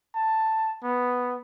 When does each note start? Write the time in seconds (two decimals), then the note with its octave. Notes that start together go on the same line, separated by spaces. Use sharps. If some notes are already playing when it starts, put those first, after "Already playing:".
0.15 A5
0.83 B3